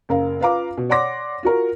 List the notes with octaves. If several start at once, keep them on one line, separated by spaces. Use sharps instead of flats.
F#1 A#4 F5
F4 B4 F5 A#5 D6
B2
C#5 D5 F#5 C6 D6 A#6
F4 F#4 A#4